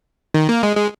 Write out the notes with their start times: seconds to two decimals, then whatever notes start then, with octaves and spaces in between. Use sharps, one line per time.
0.34 D#3
0.49 A#3
0.63 G#3
0.77 G#3